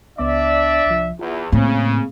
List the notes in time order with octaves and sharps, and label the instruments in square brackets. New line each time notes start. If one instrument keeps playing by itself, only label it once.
[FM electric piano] C#2 B3 D6 [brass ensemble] D4 D5 E5
[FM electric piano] C2 F3
[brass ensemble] E2 [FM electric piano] F4
[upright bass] A2 [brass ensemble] C#3 [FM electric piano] A3 A#3 C4